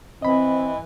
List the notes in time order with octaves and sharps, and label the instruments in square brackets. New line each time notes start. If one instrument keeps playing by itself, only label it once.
[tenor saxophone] E3 [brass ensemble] C4 [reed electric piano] D#5 B5